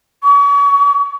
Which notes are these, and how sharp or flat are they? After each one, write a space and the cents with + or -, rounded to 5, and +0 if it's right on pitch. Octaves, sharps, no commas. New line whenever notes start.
C#6 +40